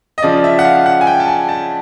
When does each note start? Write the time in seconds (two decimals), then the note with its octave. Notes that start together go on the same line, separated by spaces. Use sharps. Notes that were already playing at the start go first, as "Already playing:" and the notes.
0.18 D#5
0.23 C#3 F3 D5
0.44 E5
0.59 F#5
0.65 F5
0.86 F#5
1.01 G#5
1.07 G5
1.20 A5
1.28 G#5
1.49 A5